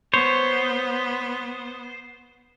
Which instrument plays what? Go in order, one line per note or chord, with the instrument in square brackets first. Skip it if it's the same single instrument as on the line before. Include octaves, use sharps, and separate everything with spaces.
[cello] B3 [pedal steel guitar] C5 [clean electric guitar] C#5